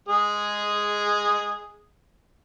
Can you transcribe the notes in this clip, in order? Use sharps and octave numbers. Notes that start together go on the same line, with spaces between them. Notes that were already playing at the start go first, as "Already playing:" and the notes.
G#3 G#4